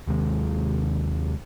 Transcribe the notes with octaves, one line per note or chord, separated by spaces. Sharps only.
D#2 C3 G#3